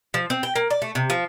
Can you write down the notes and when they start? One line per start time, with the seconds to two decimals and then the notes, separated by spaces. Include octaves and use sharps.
0.14 F3
0.30 C4
0.43 G5
0.56 A#3
0.70 D5
0.82 A3
0.95 C3
1.10 F3